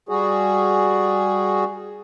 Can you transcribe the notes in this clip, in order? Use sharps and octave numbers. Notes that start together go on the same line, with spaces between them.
G3 F#4 G#4